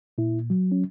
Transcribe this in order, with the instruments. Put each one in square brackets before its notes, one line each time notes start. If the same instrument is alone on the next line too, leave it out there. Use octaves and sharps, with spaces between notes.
[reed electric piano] A#2 E4
F#3
C#4